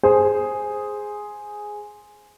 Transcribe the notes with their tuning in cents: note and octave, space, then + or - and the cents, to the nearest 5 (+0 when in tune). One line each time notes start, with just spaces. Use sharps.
G#4 +0 C5 +0